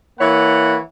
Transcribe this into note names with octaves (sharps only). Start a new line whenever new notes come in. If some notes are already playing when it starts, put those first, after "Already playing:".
E3 A#3 C#5 F#5 B5